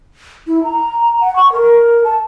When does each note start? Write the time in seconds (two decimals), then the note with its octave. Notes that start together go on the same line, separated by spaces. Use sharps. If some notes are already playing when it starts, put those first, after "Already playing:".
0.47 E4
0.64 A#5
1.21 F#5
1.36 C#6
1.52 A#4
2.04 A5